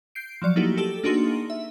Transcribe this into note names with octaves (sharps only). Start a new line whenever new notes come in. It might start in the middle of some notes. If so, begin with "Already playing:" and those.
G6 C7 D7
F3 F#3 D5 C#7
A3 A#3 D#4 E4 F#4 G4
G4 A4 E6
A#3 D4 D#4 F#4 G#4 C6
E5